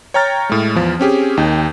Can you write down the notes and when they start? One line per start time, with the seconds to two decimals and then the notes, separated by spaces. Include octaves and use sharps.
0.14 C#5 G5 A#5 F6 A6
0.49 A2 G#3
0.75 E2 F3
0.99 C4 C#4 G4 G#4
1.37 D#2 D#4 G5